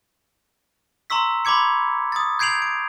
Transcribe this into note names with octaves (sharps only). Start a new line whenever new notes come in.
A#5 C6 C#6 E6 B6
B5 C6 D6 G#6 C#7
D#6 A6
G6 G#6 C7 D7 F7 F#7
D7